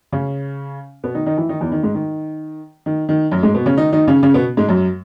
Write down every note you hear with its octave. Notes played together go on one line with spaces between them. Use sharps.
C#3 C#4
B2 B3
D#3 D#4
D#3 D#4
E3 E4
D#3 D#4
E2 E3
D#3
G#2 G#3
D#3
D#3
D#3
F#2 F#3
G#2 G#3
B2 B3
C#3 C#4
D#3 D#4
D#3 D#4
C#3 C#4
C#3 C#4
B2 B3
G#2 G#3
F#2 F#3